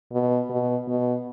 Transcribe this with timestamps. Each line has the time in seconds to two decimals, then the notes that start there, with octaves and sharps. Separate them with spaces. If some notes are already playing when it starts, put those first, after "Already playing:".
0.12 B2
0.50 B2
0.88 B2